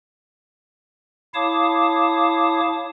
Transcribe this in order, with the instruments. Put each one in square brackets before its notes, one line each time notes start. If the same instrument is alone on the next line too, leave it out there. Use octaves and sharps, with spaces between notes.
[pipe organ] E4 C#5 F5 A5 D6 D#6